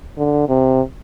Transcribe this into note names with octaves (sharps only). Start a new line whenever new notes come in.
D3
C3